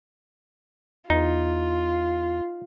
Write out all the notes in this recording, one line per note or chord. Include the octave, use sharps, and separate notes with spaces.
E2 D#4 F4